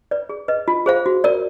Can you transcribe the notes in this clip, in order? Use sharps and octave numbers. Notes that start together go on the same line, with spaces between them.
B4 D5
G#4
B4 D#5
F4
G#4 C5 F5
F#4
A#4 D5